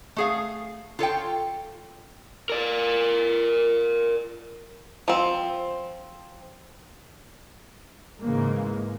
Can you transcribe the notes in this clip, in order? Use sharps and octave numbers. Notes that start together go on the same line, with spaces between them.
A3 G#4 F5
F4 A4 C#5 G5
A#4 D5
F3 C4
G#2 C#3 E3 G#3 A#3